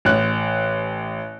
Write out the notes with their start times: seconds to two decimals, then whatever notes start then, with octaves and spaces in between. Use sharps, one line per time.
0.05 A1 F#6